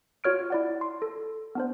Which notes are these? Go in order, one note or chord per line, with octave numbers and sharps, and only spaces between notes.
F4 F#4 C#5 F6 D7
E4 D5 F#5
C6
A4
B3 D4 C5